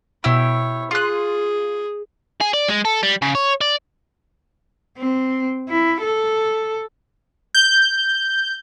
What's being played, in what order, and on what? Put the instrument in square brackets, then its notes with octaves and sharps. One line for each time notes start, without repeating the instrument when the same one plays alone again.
[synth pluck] B2 E6 [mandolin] E4 G4 [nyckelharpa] C#5
[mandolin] F4 F#6 [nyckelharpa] G#4 [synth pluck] C6
[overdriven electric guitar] G#4
D5
G#3
A4
G3
C#3
C#5
D5
[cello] C4
E4
A4
[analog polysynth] G6